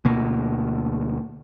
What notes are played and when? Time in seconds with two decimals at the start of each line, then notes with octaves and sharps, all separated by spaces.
0.05 D2 B2 A#3